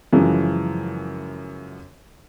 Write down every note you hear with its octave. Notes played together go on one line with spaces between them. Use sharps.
F#2 C#3 E3 F3 G#3